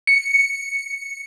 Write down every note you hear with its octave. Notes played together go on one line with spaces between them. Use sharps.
C#7